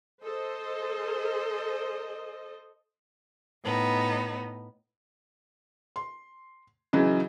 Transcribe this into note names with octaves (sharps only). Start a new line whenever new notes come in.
A4 C5 D#5
A2 B3 D#4
C6
C#3 E3 F#3 D#4